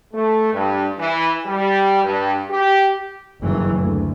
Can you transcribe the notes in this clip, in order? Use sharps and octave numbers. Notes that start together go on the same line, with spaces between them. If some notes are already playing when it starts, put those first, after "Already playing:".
A3
G2
E3
G3
G2
G4
F#1 G2 D#3 E3 F#3
D2